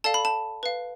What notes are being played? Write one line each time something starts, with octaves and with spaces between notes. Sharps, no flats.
A4 D5 F5 A5
B5
A5
B4 F5